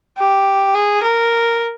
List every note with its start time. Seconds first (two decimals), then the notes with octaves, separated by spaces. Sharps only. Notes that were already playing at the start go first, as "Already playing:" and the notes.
0.18 G4
0.75 G#4
1.03 A#4